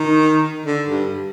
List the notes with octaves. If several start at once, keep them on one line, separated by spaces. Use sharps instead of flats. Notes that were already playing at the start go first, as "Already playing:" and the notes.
Already playing: D#3
D3
G2